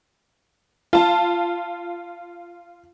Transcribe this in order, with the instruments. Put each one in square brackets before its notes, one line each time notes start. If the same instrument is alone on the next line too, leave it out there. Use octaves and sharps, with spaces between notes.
[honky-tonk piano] F4 A5